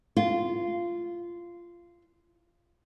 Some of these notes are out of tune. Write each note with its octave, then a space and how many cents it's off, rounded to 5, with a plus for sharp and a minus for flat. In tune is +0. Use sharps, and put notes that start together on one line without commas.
F4 -15